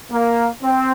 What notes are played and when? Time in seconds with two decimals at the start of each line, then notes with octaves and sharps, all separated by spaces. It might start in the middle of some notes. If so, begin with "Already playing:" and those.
0.12 A#3
0.62 C4